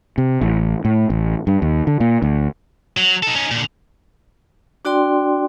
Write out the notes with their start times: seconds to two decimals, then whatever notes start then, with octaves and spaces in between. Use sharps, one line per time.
0.18 C3
0.41 A1
0.85 A2
1.10 A1
1.47 G2
1.62 D#2
1.87 D3
2.00 A#2
2.22 D2
2.97 F#3
3.23 D#4 A4
3.35 C#4 D#4
3.51 A#2 D3
4.85 D4 F#4 D5 G5 C6